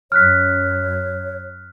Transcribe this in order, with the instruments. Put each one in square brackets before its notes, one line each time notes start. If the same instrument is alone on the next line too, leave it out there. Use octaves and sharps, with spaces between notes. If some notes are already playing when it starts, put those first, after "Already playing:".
[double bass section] F#2 [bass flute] C#5 [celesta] F6 F#6 B6